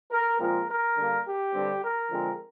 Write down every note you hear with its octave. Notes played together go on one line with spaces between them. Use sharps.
A#4
A#2 F3 G#3 C4 A#4
A#4
D3 G3 A#3
G4
G2 D3 G3 C4
A#4
D3 F3 G#3 C4